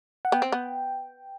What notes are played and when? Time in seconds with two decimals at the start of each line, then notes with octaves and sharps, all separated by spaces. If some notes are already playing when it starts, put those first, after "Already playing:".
0.25 F#5
0.32 B3 G5
0.42 C4
0.52 B3